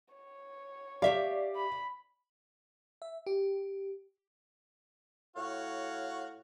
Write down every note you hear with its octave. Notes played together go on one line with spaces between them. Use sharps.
C#5
G4 D5 E5 F5
B5
E5
G4
A2 F#4 C#5 F5